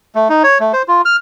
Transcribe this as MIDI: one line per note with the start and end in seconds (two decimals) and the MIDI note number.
0.15 0.28 57
0.29 0.43 63
0.43 0.58 73
0.60 0.72 57
0.73 0.82 72
0.88 1.01 65
1.05 1.16 89